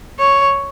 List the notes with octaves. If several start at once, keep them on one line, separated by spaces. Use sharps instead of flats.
C#5